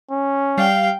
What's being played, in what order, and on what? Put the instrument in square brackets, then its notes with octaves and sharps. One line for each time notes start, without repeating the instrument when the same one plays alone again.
[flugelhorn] C#4
[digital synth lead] G3 [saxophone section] F5 [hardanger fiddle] G5